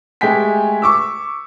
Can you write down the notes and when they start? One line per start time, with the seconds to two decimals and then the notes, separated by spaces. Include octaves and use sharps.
0.21 G#3 A3 G4 G5 G#5 B6
0.82 C#6 D6 E6